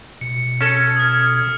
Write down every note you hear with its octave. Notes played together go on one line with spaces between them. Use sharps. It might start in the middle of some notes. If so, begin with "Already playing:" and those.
B2 C#7
C#4 A4 G#6
D#6 F6
D#6